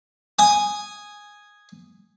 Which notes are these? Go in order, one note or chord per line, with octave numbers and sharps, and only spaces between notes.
G#5 D#6